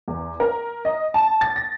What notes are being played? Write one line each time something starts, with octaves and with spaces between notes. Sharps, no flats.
E2
A#4
D#5
A5
A6
A#6